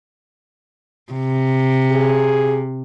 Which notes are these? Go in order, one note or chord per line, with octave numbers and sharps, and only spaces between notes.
C3
G#4